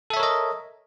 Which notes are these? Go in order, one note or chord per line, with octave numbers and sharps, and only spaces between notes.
A4 A#4 C#5 D#5 E5